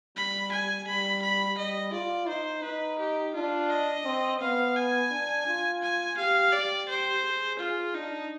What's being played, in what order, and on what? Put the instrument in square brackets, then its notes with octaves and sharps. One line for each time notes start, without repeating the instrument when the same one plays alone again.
[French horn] G3 [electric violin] B5
[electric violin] G#5
[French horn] G3 [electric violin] B5
[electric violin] B5
[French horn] G3 [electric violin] D#5
[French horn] F4 [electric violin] D5
[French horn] D#4 [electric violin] C5
[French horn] D#4 [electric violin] B4
[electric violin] G4
[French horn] D4 [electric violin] F4
[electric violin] D#5
[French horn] C4
[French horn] B3 [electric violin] F5
[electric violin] G#5
[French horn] D4
F4
[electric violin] G#5
[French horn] G4 [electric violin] F5
[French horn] G4 [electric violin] D5
[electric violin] C5
[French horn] G#4
[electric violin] F4
[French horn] D4 [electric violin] D#4